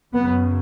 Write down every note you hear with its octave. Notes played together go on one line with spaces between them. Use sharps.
F#2 C#3 B3